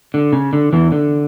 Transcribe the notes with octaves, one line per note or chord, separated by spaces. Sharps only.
D3
C#3
D3
E2 E3
D3